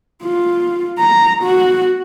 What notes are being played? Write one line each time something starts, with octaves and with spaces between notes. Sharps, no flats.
F4
A#5
F#4